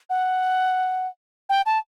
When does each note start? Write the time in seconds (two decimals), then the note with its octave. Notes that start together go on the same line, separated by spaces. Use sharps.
0.10 F#5
1.49 G5
1.66 A5